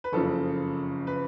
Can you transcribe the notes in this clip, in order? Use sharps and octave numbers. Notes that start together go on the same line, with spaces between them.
B4
F#1 F2 C#3 A4
B4